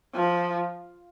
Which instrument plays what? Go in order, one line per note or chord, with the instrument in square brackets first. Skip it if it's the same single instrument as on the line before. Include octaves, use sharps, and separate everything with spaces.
[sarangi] F3